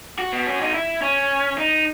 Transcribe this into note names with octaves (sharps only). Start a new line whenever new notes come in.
F#4
B3
C#4
D#4
E4
C#4
D#4